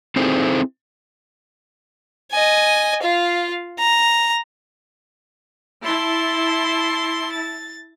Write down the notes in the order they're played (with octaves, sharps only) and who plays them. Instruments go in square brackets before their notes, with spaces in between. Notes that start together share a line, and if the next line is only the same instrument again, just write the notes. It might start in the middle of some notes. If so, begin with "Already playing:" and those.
[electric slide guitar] C4 D#4 E4 G#4 A4 C5
[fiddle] D#5 G#5
F4 F5
A#5
[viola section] E4 A5 [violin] C6
[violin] A6